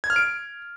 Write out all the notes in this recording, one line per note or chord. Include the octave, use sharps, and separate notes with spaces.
G#6
F6
D7